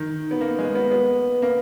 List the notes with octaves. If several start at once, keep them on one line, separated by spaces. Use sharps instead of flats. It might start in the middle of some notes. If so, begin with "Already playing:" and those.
Already playing: D#3
B3
A#3
G#3
B3
B3
A#3